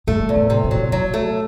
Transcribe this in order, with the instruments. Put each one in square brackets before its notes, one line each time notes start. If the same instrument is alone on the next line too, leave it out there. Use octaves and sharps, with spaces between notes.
[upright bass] G2 [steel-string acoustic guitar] A3
[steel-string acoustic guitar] E2
[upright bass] A2
[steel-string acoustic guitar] C3
[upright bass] B2
[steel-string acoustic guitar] F#3
[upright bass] B2 [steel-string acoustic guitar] F#3
[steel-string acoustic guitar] A3